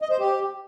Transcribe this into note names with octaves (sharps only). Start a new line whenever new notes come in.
D#5
C5
G4